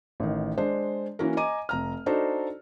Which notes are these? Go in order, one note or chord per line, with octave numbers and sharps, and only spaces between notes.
A1 D#3
G#3 D4 C5
E3 A#3 C#4 F#4 A#4
D#5 G#5 A#5 D6 D#7
F1 A#5 F6
D4 D#4 F#4 A4 C5 A#5